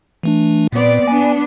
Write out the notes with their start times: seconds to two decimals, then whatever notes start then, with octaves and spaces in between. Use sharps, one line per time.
0.23 E3 A3 D4
0.72 A#2 B3 C4 D5
1.08 B3 D4 G#5